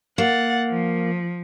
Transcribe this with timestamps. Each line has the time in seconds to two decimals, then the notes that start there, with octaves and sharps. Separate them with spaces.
0.18 A#3 F#5 A6
0.69 F3